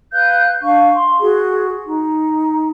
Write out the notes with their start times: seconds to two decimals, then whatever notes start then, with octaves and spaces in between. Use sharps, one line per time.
0.12 B4 F5 F#6 G6
0.63 D4 F5 C#6
0.94 C6
1.20 F#4 G#4
1.86 D#4